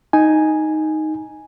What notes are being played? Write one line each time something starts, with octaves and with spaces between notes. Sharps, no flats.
D#4 G#5